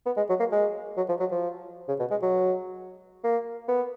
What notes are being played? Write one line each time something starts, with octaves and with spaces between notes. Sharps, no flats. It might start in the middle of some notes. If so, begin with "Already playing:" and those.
B3
G#3
F#3
A#3
G#3
F#3
F3
F#3
F3
C#3
B2
G#3
F#3
A#3
B3